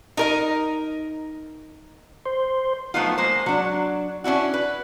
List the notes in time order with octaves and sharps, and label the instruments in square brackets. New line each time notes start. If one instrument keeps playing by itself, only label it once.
[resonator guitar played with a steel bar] D#4 A#4 D#5
[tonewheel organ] C5
[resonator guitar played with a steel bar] F3 F#3 A3 B3 D#4 F4
G#3 A#3 C5
F#3 D4
C#4 D4 E4 F#4
B4